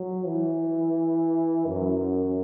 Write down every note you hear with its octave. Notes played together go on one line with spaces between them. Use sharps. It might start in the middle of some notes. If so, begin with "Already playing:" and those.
Already playing: F#3
E3
F#2